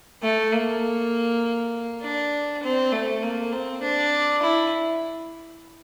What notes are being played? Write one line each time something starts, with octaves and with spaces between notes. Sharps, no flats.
A3
A#3
D4
C4
A3
A#3
C4
D4
E4